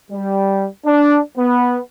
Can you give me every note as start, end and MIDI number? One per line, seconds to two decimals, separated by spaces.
0.11 0.66 55
0.85 1.19 62
1.37 1.80 59